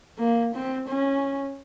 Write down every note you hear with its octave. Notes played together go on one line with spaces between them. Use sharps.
A#3
C4
C#4